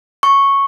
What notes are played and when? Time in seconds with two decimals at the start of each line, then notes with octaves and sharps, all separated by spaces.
0.23 C#6